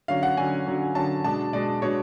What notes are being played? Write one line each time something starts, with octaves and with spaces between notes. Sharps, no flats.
D3 F#3 C#4 F5
F#5
D3 F#3 C#4 G#5
D3 F#3 C#4
D3 F#3 C#4 A5
B2 G#3 D4 A5
B2 G#3 D4 D5
B2 G#3 D4 C#5